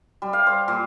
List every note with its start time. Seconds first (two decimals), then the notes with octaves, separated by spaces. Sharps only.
0.22 G3
0.33 F5
0.47 C5
0.68 A#2